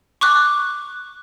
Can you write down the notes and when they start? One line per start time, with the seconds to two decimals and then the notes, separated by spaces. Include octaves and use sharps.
0.21 C#6 D6 F#6